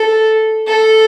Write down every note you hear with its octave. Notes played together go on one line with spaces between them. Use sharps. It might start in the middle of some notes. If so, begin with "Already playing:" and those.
Already playing: A4
A4